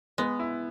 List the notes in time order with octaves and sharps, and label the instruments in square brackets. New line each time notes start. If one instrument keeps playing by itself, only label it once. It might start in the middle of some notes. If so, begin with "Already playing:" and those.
[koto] G#3 [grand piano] B3
[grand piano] E4